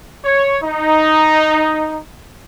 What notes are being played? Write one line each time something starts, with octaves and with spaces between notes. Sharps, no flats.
C#5
D#4